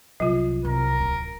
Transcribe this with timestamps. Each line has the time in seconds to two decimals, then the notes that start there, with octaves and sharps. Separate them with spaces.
0.20 C2 F#3 F4
0.65 C2 A#4
1.00 D1